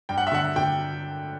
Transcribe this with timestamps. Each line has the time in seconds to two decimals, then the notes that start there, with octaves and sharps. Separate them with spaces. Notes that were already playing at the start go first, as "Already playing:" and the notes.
0.09 G2 G5
0.18 F#5
0.27 E5
0.32 D3 F#5
0.56 D3 G5